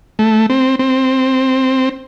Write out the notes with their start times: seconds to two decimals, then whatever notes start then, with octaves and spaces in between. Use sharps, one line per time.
0.19 A3
0.50 C4
0.79 C4